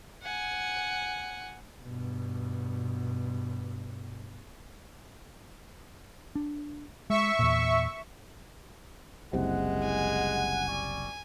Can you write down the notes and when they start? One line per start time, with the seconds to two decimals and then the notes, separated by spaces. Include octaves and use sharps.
0.22 F#5 G#5
1.82 G2 B2
6.35 D4
7.10 G#3 E5 C#6
7.39 E2 A#2
9.33 F#1 C2 C3 G#3 F#5
9.85 G#5
10.69 G3 D5 C#6